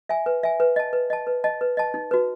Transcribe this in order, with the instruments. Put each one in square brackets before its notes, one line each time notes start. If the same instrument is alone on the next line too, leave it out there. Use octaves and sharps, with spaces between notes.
[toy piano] E5 G#5
B4
E5 G#5
B4
D#5 A5
B4
D#5 A5
B4
D#5 A5
B4
D#5 A5
D#4
F#4 B4